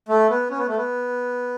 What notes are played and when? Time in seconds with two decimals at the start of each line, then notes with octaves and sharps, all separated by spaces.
0.09 A3
0.30 B3
0.50 C#4
0.58 B3
0.68 A3
0.76 B3